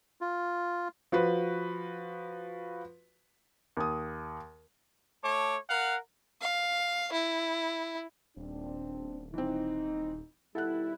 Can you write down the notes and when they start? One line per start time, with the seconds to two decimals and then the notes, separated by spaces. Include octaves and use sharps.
0.21 F4
1.12 F3 F#4 B4
3.77 D#2 D#6
5.23 A3 C#5 A5 D6
5.69 A#4 F5 F#5
6.42 F5
7.13 E4
8.37 D#1 C4 D4
9.34 E3 C4 D#4
10.55 B2 D#3 G3 E4 A4 F#5 F#6